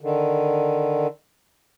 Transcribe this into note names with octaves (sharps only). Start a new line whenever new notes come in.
D3 D#3